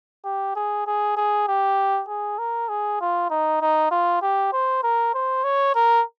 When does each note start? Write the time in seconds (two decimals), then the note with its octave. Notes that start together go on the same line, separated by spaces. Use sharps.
0.24 G4
0.55 G#4
0.86 G#4
1.16 G#4
1.48 G4
2.09 G#4
2.38 A#4
2.69 G#4
3.01 F4
3.30 D#4
3.61 D#4
3.91 F4
4.22 G4
4.53 C5
4.83 A#4
5.14 C5
5.44 C#5
5.75 A#4